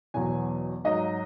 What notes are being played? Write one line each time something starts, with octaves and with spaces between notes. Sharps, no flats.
E2 B2 F#3 G#5
G#2 F#3 D#5